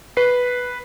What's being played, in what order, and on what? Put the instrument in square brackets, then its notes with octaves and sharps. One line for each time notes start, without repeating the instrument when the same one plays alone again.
[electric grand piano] B4 C7